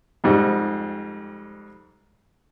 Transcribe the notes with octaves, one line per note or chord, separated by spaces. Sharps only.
F2 G#2 G3